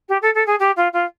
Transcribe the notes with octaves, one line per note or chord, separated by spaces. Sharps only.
G4
A4
A4
G#4
G4
F4
F4